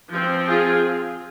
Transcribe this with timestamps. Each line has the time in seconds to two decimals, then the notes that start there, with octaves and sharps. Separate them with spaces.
0.10 F3 C4
0.47 F4 G#4